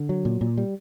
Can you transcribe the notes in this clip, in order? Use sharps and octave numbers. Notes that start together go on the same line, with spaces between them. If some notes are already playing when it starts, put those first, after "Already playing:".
Already playing: D3
F#3
A#2
A#2
G3